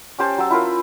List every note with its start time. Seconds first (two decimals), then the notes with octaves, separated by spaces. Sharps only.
0.19 C#4 G4 C5 A5
0.38 F#3 E6
0.51 E4 F4 A#4